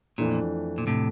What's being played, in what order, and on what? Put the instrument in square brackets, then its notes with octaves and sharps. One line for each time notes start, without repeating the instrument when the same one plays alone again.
[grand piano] F2 E3 A3 D4 [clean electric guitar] A#2
[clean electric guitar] A#2
A2 C3